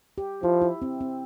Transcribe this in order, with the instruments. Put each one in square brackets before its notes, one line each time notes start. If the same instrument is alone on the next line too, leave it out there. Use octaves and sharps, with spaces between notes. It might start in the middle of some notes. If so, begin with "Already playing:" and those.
[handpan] G4
[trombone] F3 [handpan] E4
[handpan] E4
C4
C4